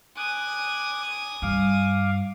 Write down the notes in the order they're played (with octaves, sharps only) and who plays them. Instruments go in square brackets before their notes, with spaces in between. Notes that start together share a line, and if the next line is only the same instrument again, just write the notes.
[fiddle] G#5 D#6 [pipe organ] D6 F#6
[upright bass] G2 [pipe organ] F5 D6